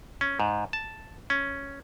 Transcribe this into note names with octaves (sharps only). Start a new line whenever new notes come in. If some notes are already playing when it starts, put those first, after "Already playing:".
C#4
G#2
A5
C#4